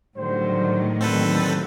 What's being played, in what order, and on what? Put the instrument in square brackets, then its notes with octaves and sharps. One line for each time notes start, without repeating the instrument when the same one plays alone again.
[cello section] A2 D#3 F#3 [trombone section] D3 G3 C5
[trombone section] D#2 D3 [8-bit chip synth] C4 A4 B4